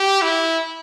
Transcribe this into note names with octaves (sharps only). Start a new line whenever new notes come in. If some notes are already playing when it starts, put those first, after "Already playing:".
Already playing: G4
E4